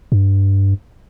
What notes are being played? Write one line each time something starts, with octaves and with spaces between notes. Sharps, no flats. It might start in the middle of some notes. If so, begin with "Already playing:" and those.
G2